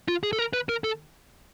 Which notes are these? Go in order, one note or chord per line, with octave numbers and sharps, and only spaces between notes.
F4
G#4
A4
A#4
B4
A#4
A4